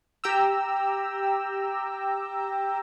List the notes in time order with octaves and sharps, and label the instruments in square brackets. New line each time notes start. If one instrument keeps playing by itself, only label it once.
[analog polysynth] G4 G5 A#5 E6